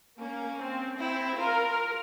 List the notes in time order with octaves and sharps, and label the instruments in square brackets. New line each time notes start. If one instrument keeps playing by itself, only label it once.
[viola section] A#3 [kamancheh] C#4
[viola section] C4
[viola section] C4 [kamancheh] E4
[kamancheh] F4 [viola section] A#4